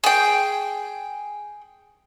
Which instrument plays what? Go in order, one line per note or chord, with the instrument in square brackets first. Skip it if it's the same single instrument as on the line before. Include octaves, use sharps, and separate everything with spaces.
[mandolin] G#4 G5